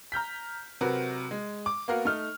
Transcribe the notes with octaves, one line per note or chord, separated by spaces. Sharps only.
A#5 F6 G6 B6
C3 F#3 F#4 A#4 B4
G#3
D6
A#3 B3 F#4 A#4 F5
A3 D#4 F6